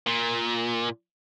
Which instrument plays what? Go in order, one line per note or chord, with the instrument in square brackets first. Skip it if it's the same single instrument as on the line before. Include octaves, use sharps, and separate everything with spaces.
[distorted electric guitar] A#2